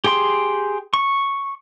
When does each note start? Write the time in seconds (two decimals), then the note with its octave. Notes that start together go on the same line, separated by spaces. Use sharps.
0.04 G4 G#4 G5 C6
0.94 C#6